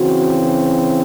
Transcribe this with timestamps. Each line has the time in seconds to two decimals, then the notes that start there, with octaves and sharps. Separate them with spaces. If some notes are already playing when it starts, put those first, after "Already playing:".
Already playing: C#3 E3 C4 F#4